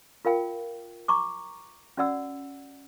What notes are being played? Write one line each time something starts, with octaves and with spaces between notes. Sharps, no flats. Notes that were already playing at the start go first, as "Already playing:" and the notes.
F4 A#4 F5 G5
A#5 C#6 D6
C#4 F#4 D5 F#5 E6